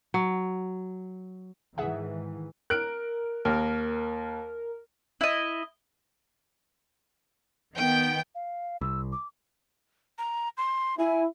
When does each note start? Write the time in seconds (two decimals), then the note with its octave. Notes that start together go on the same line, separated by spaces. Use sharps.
0.14 F#3
1.78 G#2 D#3 E3 G#4 E5 F#5
2.70 A#4 F#6 D7
3.45 D#2 A#4
5.21 E4 D#5
7.76 D#3 B3 G5
8.35 F5
8.81 C2 E6
9.12 D6
10.18 A#5
10.58 C6
10.99 E4 G#5